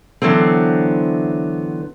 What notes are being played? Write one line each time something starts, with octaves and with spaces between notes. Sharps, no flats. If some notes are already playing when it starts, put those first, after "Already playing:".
D3 E3 F#3 B3 C4